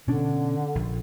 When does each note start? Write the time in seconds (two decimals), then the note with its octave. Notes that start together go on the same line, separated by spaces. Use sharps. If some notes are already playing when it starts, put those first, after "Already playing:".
0.07 B2 D3 C#4 D4
0.75 A#1